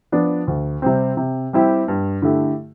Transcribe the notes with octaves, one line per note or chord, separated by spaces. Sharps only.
F3 B3 D4
D2
C3 G3 C4
C3
G3 C4 E4 G4
G2
D3 A3 E4 G4